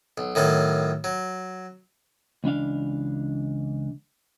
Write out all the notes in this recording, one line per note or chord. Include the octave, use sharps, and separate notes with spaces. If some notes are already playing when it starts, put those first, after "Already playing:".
B1
A2 D#3 F#3 A4
F#3
C#2 E3 D4 F5